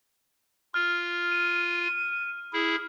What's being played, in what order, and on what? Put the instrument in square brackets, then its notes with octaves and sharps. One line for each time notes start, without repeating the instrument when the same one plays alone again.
[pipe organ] F4 [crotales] F6
[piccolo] D#7
[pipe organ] E4 G#4